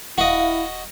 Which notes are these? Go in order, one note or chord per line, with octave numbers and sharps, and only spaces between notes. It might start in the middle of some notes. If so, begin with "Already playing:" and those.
D#1 E4 F#4 D#5 F5